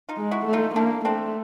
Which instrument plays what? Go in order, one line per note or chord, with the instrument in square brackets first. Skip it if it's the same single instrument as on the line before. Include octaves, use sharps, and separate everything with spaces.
[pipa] D#4 F4
[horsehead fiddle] G#3
[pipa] E4 F#4
[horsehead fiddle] A3
[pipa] D#4 F4
[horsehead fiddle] A#3 [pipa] D4 E4
[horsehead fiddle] A3 [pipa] C4 D4